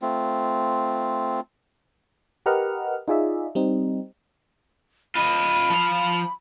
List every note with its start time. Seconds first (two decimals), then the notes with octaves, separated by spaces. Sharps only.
0.02 A3 C4 F4
2.46 G4 A#4 B4 D#5 F#5 F6
3.08 D#4 F4 G#4 D5 E5
3.55 G3 C4 D#4
5.15 F4 D#5 B5
5.70 F3 F5